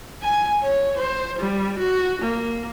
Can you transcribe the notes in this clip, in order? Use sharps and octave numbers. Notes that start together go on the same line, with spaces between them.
G#5
C#5
C5
G3
F#4
A#3